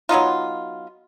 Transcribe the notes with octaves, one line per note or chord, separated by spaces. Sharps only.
F#3 B3 D#4 F4